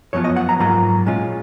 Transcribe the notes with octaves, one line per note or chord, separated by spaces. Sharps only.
F#2 F3 B3 F4 C#5
D#5
F#5
A#5
G#2 F#3 A#3 F4 A#5
A#2 G#3 C#4 F4